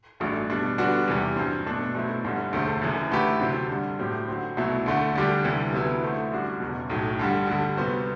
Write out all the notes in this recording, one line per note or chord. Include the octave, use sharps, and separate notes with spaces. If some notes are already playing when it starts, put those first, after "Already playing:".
A1 G2 F#3 A3 D4
B2 G3 D4
D3 G3 B3 D4 F#4
E2 C3 E3 G3
G2 F#3 C4
B2 A3 D4 A4
B2 F#3 A3 C4 E4
G1 G2 D3 G3
E1 D2 D3 A3 C4
F#1 F#2 E3
D3 A3 E4 G4 B4
D2 C3 F#3 C4
G2 D3 G3
A2 F#3 C4 G4
D3 F#3 C4
C2 B2 F#3 A3 E4
D2 D3 A3
D2 D3 G3 D4 G4
D2 C3 E3 G3
D2 C3 F#3 B3 E4
D3 A3 C4 E4
F#2 D3 G3 D4 F#4
F#1 E2 B2
B1 A2 F#3
G2 D3 G3
D2 D3 G3
C3 G3 B3 F#4 C5